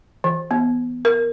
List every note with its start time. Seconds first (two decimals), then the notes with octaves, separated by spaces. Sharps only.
0.24 E3
0.51 B3
1.05 A#4